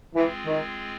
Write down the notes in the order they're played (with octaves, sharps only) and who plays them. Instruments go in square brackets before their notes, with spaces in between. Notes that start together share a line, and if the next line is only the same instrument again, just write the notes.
[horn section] E3 [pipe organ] G#3 C4 F4 G#4
[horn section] D#3